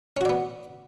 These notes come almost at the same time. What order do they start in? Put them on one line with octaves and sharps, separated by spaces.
C#4 F#4 D5 B3